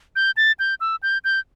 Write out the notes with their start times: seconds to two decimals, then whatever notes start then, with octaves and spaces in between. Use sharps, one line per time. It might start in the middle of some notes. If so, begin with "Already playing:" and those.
0.16 G6
0.37 A6
0.59 G6
0.80 E6
1.03 G6
1.24 G6